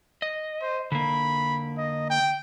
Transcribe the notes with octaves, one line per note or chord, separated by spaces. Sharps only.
D#5
C5
D3 A#3 B5
D#5
G5